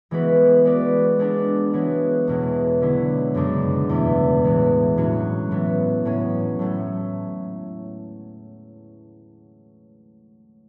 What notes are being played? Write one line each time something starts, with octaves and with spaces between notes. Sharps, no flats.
E3 G#3 B3 F#4 B4
G#3 B3 F#4 B4 D5
G#3 B3 D4 A4
E3 G#3 B3 F#4 C#5
E2 B2 G#3
D3 F#3 B3 E4
F#2 C#3 G#3 D4 A4
E2 B2 A3
A2 E3 G#3 B3
A2 F#3 C#4 F#4
A2 E3 B3
A2 F#3 C#4
A2 F#3 A3